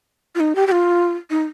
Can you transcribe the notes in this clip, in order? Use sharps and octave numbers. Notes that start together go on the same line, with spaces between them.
F4
D#4
G4
G4
F4
D#4